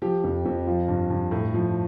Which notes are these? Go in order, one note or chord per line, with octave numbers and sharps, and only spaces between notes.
F3 G4
F2
F2
F3 F4
G2
G2
A2
F3